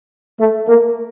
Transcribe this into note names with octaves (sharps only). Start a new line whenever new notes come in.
A3
A#3